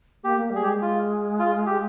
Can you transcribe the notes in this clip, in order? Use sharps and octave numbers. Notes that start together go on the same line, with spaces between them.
A#3 G4
A#3
G3
G#4
G#3 G4
F4
F4
G4